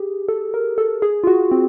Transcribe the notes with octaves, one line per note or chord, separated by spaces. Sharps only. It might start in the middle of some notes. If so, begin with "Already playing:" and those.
Already playing: G4 G#4
A4
A#4
A4
G#4
F4
F#4
C4